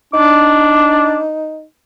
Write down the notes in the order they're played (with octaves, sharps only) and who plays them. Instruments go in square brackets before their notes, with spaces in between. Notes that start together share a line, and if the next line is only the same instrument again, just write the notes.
[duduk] D4 [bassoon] D#4 [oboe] D6